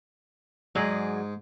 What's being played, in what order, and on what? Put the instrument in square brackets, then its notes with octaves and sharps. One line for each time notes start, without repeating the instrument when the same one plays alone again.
[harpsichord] G#2 [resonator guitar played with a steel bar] F#3 G#4 D5